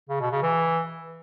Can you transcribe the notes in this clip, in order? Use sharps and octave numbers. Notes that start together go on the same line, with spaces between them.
C#3
B2
C#3
E3